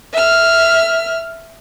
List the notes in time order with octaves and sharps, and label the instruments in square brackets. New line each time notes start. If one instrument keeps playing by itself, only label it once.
[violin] E5 F6